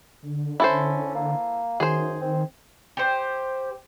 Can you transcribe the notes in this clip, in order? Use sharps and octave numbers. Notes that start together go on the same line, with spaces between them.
D3
C#4 E4 A4 C5
A#3
F#2 D#3 G#4 C5
C4
G4 C5